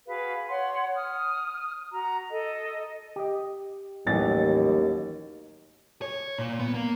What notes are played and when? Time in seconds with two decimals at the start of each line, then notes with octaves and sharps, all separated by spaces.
0.07 F#4 G#4 B4 F5
0.50 C#5 F#5 C6
0.94 D#6 F6
1.91 F#4 A#5
2.31 A4 D#5
3.16 G4 D#5
4.06 A1 D#2 A2 E3 F#3 G3 A6
6.02 C#5
6.38 A#2
6.59 B3
6.74 A#3